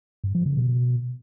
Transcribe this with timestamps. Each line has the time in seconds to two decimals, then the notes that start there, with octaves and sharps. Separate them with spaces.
0.24 G2
0.35 F3
0.46 C#3
0.57 B2